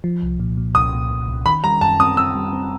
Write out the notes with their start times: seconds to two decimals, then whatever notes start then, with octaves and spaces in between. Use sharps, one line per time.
0.04 F3
0.22 C2
0.40 A#2
0.57 A#2
0.75 C2 D#6
0.93 A#2
1.11 A#2
1.28 C2
1.46 D#3 B5
1.64 G3 A#5
1.81 F#2 A5
2.00 C4 D#6
2.17 C4 E6
2.35 G3
2.53 C4